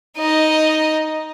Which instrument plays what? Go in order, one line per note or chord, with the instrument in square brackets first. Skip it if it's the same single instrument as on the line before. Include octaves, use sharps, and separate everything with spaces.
[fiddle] D#4 D#5